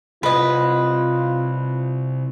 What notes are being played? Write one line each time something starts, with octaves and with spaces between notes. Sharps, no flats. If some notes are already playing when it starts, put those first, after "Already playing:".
C2 F4 B4 D#5